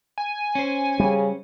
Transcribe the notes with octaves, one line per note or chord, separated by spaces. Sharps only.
G#5
C#4 C5
C#3 G3